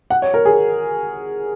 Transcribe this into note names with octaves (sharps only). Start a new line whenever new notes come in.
F#5
C#5
A#4
G#4